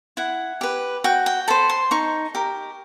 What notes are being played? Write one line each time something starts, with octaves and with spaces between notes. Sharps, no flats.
E4 F#5
G4 B4
F#4 G5
G5
A4 C5 B5
C6
D#4 C#6
G4 A#4